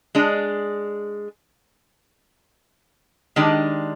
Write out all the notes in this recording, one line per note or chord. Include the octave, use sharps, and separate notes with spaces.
G#3 D4 G#4
D#3 G#3 D4 G4